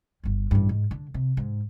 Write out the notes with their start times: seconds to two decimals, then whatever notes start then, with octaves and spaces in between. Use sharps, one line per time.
0.24 G1 G3
0.51 A1 G2
0.69 G#2
0.91 D3
1.14 C3
1.37 G#2